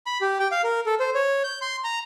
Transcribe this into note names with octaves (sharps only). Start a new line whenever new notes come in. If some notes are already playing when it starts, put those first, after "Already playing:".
B5
G4
G5
F5
A#4
A4
C5
C#5
G6
C6
A#5